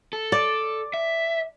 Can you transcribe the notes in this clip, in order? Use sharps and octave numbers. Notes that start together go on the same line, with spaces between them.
A4
D5
E5